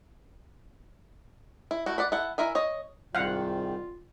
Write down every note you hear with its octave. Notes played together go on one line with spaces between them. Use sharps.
E4
A3 E4 F#4
D5 F#5 B5
E4 A4 F#5
E4 A#4 E5 G#5
C#5 D#5
C2 G#2 D#3 G3 F4 F5 F#5